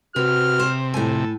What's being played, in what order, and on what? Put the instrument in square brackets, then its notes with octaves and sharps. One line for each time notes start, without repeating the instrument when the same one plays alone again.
[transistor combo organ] C3 [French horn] F#4 [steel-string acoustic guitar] B4 [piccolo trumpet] F6
[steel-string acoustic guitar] C5
[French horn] F2 [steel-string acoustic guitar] A2 G#5 [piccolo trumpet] A4